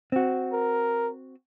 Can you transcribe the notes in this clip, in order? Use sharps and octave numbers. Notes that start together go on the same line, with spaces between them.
C4 F#4
A#4